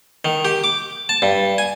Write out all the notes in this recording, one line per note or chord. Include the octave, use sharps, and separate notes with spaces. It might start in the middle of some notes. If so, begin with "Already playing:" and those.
D#3
G4
D6
A5
G2
G#5